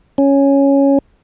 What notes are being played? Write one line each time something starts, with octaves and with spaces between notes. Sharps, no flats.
C#4